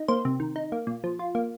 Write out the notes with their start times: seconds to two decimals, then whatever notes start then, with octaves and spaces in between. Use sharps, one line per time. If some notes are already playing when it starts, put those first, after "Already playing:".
Already playing: D#4
0.08 A#3 C5
0.25 C3
0.40 D#3
0.56 D#4
0.72 A#3
0.87 A#2
1.04 F3
1.19 F4
1.35 A#3